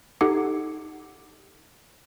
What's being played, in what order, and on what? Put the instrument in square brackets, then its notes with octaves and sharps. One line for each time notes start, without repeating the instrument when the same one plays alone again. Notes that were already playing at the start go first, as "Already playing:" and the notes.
[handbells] D#4 G4 A4 F#5 D6 C#7